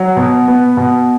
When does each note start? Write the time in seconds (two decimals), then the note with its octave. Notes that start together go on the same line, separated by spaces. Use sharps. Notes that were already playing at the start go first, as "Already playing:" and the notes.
Already playing: F#3
0.17 B2
0.48 B3
0.77 B2